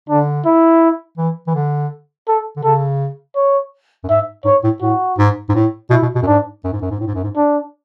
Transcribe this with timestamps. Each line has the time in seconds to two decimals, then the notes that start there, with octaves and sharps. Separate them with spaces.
0.09 D3 D4
0.46 E4
1.18 E3
1.47 E3
1.55 D3
2.28 A4
2.57 D3
2.63 C#3 A4
3.36 C#5
4.04 F#2
4.09 G#2 E5
4.45 G#2 C#5
4.64 A2
4.81 A2 F#4
5.18 G#2
5.49 G#2
5.55 A2
5.90 B2 E4
6.03 B2
6.15 B2
6.23 F#2
6.27 G#2 D4
6.64 F#2
6.73 G#2
6.82 F#2
6.91 G#2
7.00 A2
7.07 G#2
7.15 F#2
7.24 G#2
7.36 D4